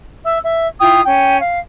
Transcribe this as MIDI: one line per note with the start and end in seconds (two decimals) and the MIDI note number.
0.25 0.38 76
0.25 0.38 88
0.43 0.68 76
0.81 1.02 64
0.81 1.02 65
0.81 1.02 79
0.81 1.02 87
1.05 1.39 61
1.05 1.39 79
1.40 1.59 77